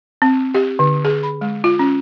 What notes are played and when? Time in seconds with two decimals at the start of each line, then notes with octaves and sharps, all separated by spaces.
0.22 C4
0.54 G4
0.79 D3
1.05 G#4
1.23 B5
1.41 G#3
1.64 F4
1.79 C#4